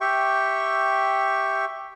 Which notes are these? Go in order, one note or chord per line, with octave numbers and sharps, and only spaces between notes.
G4 E5 G5 C#6